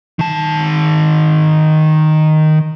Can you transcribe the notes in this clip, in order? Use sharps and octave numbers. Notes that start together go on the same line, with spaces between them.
D#3 A5